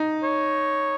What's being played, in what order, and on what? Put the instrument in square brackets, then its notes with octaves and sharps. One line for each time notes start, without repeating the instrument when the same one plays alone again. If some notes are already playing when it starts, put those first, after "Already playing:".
Already playing: [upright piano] D#4
[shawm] C#5